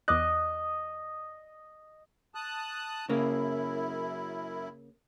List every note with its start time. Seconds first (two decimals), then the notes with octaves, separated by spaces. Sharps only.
0.08 E2 D#5 D6 F#6
2.35 A5 D#6 F#6
3.09 F#2 C#3 A#3 E4